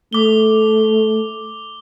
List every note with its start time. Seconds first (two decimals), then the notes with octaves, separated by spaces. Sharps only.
0.13 A3 D6 G7